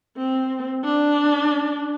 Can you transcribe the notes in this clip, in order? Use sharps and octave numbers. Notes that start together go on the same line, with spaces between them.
C4
D4